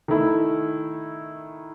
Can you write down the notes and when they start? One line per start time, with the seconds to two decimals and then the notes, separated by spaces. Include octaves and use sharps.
0.08 D#3 A3 E4